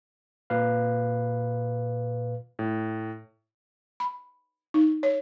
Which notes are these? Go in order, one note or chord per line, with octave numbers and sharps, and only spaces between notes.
A#2 B4 F5
A2
B5
D#4
C#5